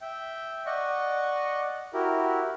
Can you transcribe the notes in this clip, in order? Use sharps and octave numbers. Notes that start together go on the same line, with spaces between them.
E5 G5
D5 D#5 F#5 C#6
E4 F#4 G4 A#4